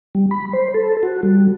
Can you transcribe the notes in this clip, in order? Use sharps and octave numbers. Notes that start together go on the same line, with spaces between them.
G3
B5
C5
A4
F#4
G3